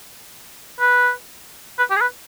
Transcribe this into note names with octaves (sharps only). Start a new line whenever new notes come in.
B4
B4
G4
G#4
B4